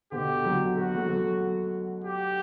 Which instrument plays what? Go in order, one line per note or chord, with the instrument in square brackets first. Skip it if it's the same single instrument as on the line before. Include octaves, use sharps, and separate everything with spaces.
[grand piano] B2 D3 [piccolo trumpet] G4
[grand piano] D3 F#3
[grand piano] A3 [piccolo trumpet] F#4
[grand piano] F#3 A3
F#3 A3
[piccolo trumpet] G4